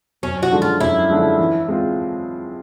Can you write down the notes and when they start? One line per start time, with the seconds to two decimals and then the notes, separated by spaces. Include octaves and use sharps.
0.23 F#2 C#4
0.43 F#4
0.52 D3 F3 G#3
0.62 F4
0.81 F#2 E4
1.10 D3 F3 G#3
1.39 E3
1.68 G#3 C4 F4